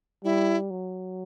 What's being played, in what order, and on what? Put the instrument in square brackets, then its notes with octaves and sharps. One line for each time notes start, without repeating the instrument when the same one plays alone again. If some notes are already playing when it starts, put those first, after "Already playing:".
[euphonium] G3 [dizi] E4
[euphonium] F#3